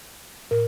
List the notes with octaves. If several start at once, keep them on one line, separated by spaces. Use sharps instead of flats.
A2 A#4